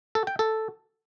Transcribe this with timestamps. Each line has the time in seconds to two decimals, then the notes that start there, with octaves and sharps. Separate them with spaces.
0.15 A4
0.27 G5
0.39 A4